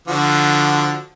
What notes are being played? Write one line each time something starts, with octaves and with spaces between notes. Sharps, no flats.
D3 F3 F#4